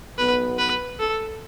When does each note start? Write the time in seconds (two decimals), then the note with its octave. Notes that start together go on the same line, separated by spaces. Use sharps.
0.18 B1 B2 B3 B4
0.58 B4
0.99 A4